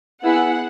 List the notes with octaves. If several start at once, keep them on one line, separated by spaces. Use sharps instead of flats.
B3 E4 G#4 F#5